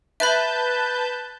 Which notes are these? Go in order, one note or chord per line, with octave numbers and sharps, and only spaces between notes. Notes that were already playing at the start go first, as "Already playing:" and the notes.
B4 E5 A5 B5 G6